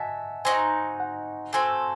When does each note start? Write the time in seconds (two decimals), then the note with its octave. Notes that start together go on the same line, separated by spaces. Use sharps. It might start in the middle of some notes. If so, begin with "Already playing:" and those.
Already playing: F#4 D#5 E5 F#5 G#5 A5
0.45 C4 D#4 F#4 G#5
1.00 F#5
1.53 A3 C4 F#4 A4 G#5